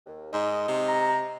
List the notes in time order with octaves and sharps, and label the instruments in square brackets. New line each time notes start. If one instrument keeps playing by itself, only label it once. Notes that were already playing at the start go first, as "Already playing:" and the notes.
[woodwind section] D#2
[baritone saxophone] G#2 [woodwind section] D#5
[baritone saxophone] C3
[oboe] A#5